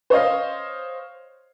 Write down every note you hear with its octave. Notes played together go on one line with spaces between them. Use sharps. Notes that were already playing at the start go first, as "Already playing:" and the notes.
C5 C#5 D#5 F5